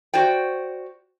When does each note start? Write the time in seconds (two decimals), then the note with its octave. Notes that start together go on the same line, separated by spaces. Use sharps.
0.14 F#4 C5 D5 G5